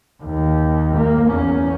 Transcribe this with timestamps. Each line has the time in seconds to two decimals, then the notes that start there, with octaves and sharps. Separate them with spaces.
0.23 D#2
0.97 A#3
1.27 E2 C#4